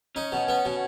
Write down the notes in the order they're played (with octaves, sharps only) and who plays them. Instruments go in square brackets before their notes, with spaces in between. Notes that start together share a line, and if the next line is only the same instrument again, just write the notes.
[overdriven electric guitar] C#4 [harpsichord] D#4
[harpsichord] B2
B3
B2